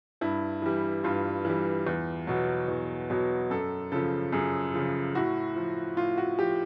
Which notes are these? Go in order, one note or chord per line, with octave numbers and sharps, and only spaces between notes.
G2 E4
E3 G3
G2 F4
E3 G3
E2
B2 F#3
E2
B2 F#3
F#2 A4
C#3 F3 A4
F#2 G#4
C#3 F3
A2 F#4
F3
A2 F4
F#4
F3 G4